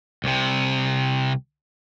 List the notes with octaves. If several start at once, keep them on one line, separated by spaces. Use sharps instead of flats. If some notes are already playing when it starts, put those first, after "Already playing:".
C2 C3